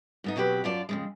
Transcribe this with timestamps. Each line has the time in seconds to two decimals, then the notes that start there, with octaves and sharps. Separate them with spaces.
0.24 G#2 B3 D#4
0.36 B2 F#3 C4 G4 B4
0.64 F#2 F4 D5 A5
0.89 F2 C#3 G#3